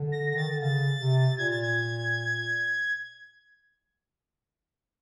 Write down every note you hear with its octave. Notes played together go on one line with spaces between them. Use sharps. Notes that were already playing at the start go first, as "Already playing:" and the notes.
Already playing: D3
A#6
A#6
D#3 A6
D3
C#3 A6
C3
A#2 G#6
A6
G#6